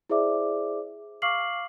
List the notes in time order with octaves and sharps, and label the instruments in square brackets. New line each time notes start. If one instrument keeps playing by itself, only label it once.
[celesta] E4 G#4 C5 D5 E5 D6
F5 C#6 D6 F6 C7 F#7